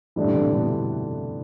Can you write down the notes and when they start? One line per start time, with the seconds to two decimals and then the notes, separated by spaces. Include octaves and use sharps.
0.16 A2 E3 G3 D4
0.25 D3
0.33 C3 E3
0.53 B2 D3